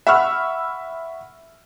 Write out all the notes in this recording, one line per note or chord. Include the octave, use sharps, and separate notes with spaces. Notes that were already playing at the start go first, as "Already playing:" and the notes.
E5 F#5 B5 C#6 E6 F6